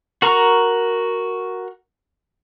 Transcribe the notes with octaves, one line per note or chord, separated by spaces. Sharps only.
F#4 A#4 A#5 C#6